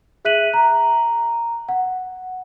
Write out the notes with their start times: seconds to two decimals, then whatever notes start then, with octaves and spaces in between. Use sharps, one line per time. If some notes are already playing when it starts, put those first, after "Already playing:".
0.25 G#4 E5 F#6 B6 D#7 F#7
0.54 A#5
1.69 F#5